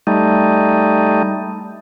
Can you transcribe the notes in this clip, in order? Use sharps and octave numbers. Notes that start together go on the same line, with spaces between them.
G3 A3 D#4